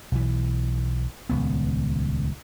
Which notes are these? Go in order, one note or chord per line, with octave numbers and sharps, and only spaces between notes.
B1 E3
D#1 C#2 B3